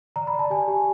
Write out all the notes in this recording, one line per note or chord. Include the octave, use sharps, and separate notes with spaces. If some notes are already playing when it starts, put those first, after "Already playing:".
D5 A#5
B5
D5
A5
G4 G#5
G4